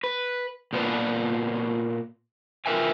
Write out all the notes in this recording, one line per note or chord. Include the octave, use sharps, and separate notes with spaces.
B4
A#2 B3 F4 A4 B4 D5
F4 A#4 B4 E5 G5 G#5